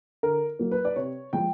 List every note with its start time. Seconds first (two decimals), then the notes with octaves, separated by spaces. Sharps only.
0.23 D3 A#4
0.59 F#3 A#3
0.71 B4
0.85 D5
0.96 C3 C#5
1.33 F3 G#3 G5